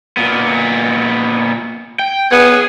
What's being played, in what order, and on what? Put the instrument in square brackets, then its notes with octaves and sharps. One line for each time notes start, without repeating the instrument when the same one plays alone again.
[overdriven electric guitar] A#2 B3
G5
[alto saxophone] B3 [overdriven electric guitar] G#4